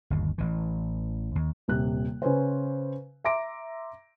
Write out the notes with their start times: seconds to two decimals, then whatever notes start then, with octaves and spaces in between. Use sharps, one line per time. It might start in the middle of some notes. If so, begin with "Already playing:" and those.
0.10 G1 D#2
0.38 A1 E3
1.35 D#2
1.68 D#1 C3 F#6
2.22 C#3 C#4 B4 C5
3.24 E5 A#5 C6 D6 A#6 D7